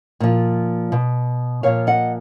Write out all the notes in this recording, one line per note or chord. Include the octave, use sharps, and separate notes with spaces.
A#2 F3
B2
A#2 F3 C#5 F5
D#5 F#5